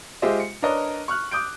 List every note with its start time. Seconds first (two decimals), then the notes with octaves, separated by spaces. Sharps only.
0.22 G#3 F4 G4 C5 D#5 E5
0.40 C#7
0.62 D4 A#4 B4 C#5 D#5
1.08 C#6 F6 F#6
1.31 D6 D#6 G6 D7